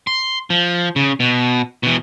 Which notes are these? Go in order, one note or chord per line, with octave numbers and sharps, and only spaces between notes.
C6
F3
C#3
B2
B2 E3